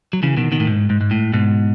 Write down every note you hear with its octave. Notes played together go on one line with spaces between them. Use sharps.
F#3
C#3 E3
B2 D#3
B2 D#3
A2
G#2
G#2
G#2
A2
G#2 B2